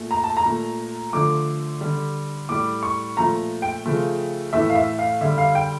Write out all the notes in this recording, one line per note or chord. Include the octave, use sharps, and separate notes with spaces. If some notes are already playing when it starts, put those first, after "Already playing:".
Already playing: A#2 A3
A#5
A5
A#5
A#2 A3
D3 F3 A3 D6
D3 G3
A2 G3 D6
C#6
A#2 F3 A3 A#5
G5
C#3 F3 A3
A2 E3 A3 E5
F5
E5
F5
D3 G3 E5
F5
G5